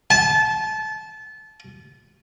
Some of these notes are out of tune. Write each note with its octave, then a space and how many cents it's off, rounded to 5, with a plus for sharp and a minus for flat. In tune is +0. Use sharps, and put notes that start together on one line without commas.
A5 -25